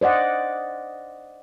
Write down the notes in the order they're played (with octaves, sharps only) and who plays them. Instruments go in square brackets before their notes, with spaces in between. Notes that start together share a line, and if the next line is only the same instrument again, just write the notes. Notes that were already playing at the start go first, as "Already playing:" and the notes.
[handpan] C5 D5 D#5 F#5